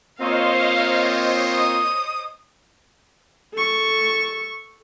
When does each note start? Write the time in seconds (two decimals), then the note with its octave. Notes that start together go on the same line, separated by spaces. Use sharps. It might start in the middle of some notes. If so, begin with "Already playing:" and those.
0.20 A#3 C4 F4 C5 C#5 D#5 F5
1.55 D#6
3.54 A4 C#6